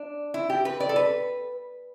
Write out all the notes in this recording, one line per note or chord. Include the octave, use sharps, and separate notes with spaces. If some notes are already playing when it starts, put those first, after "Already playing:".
Already playing: D4
E4
G4
B4
D5
A4
B4